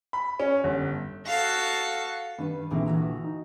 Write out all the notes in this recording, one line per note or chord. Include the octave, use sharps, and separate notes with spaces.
B5
C#4
G1
F#4 A4 F5
G2 D#3 B4
A#1 D3 E3 C4 D#4 E5
E3 F#4 A#5
D#4